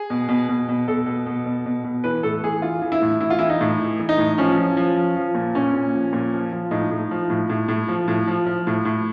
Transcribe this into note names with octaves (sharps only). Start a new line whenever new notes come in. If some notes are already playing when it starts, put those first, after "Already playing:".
Already playing: G#4
B2
B2
B2
B2
B2 A4
B2
B2
B2
B2
B2
E3 B4
A2 A4
E3 G#4
E3 F4
E3
E4
A2
E3 E4
F4
E3 E4
D#4
A2
E3
E3
D#4
A2
F3 C#4
F3
F3
F3
F3
A#2
A#2 C#4
A#2
F3
A#2
F3
F3
A2 D#4
A2
F3
A2
A2
A2
F3
A2
F3
F3
A2
A2